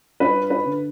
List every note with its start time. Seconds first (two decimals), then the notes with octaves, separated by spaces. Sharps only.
0.20 G2 B4
0.50 B4
0.66 D3